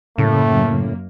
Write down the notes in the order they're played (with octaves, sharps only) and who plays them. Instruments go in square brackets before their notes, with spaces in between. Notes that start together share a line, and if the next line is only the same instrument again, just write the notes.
[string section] F#2 A#3 [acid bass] A2 [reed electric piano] C#3 [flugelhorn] A3